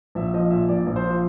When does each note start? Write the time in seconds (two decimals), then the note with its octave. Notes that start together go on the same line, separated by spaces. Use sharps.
0.15 A#1 E5
0.34 F3 D#5
0.51 A#2 E5
0.69 A#1 D5
0.87 A#1
0.96 C5
1.05 F3